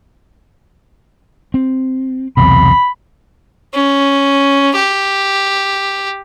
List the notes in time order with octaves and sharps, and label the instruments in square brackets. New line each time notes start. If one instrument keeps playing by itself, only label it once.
[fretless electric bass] C4
[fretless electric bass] B1 E2 C3 [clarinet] B5
[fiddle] C#4
G4